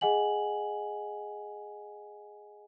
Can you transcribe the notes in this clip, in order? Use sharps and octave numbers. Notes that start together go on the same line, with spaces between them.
G#4 D#5 F#5 G#5 F#7